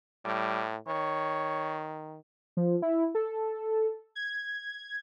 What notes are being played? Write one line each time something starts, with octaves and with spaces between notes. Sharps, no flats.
A2 G3
D#3 C#5
F3
E4
A4
G#6